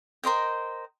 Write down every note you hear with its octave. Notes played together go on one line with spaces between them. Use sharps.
A#4 C5 D#5 G5